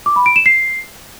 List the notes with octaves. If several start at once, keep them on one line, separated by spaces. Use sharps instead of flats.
D6
B5
D7
E7
C7